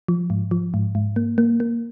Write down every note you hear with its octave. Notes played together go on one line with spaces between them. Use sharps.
F3
G#2
F3
G#2
G#2
A#3
A#3
A#3